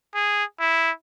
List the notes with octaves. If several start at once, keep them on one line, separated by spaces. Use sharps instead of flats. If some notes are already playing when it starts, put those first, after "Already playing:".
G#4
E4